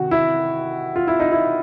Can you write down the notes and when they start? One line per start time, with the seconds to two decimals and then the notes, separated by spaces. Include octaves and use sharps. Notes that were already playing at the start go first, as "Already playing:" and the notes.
Already playing: C3 D#3 F#4
0.11 E4
0.96 F4
1.07 E4
1.20 D#4
1.32 E4